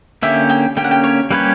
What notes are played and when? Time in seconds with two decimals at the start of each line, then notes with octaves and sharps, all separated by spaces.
0.23 D3 A#3 C#4 G4 E5
0.49 G5
0.77 D3 A#3 C#4 G4 G5
0.84 F#5
0.91 G5
1.04 C#5
1.31 G3 A#3 C#4 G4 B4 C#5